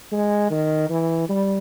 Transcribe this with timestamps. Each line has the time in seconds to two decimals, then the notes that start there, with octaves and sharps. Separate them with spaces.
0.12 G#3
0.50 D#3
0.90 E3
1.29 G3